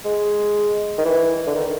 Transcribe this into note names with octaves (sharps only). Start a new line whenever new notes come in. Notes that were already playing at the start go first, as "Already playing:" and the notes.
G#3
D#3
E3
D3
D#3